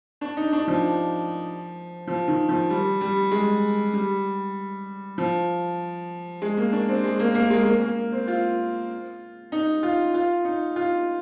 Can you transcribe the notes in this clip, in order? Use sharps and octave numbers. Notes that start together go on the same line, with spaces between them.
D4
D#4
D4
F3
F3
D#3
F3
G3
G3
G#3
G3
F3
G#3
A#3
D4
C4
G#3
A#3
A#3
G#3
A#3
A#3
C4
F4
D#4
F4
F4
D#4
F4